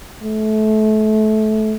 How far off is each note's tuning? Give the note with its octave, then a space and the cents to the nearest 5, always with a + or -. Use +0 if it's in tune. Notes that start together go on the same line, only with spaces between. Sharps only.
A3 -25